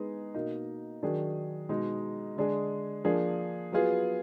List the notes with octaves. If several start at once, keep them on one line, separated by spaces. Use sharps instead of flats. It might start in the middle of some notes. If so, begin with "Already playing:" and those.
Already playing: G#3 B3 D#4 G#4
B2 A#3 D#4
D#3 F#3 D4 G#4
B2 G#3 D#4
D3 G#3 D4 G#4
F3 A#3 D4 G#4
F#3 B3 F4 G#4